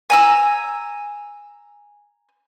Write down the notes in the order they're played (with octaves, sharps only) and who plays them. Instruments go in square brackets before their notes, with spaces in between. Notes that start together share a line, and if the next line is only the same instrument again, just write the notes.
[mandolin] G#5 A#5 E6